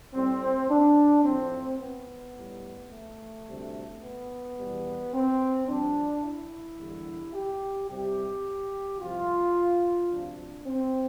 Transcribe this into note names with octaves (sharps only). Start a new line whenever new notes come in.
A2 G3 C4
D4
A2 F3 C4
B3
A2 G3
A3
D2 C3 G3
B3
E2 B2 G3
C4
G2 F3 D4
E4
E2 D3 G3
G4
C2 C3 G3 G4
C2 C3 F3 F4
D2 C3 F3 D4
C4